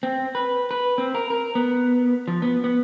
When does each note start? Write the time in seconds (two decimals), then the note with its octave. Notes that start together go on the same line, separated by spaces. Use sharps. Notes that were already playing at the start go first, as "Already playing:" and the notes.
0.03 C4
0.35 B4
0.71 B4
0.98 C4
1.15 A#4
1.30 A#4
1.55 B3
2.28 F3
2.42 B3
2.64 B3